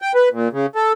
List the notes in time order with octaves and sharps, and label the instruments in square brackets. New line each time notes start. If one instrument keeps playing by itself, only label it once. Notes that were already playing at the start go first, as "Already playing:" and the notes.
[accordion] G5
B4
A#2
C#3
A4